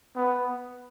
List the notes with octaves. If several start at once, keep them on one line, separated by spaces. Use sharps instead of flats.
B3